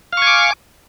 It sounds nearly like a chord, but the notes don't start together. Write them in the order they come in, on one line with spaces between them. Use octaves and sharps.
F5 C#6 G#5 D6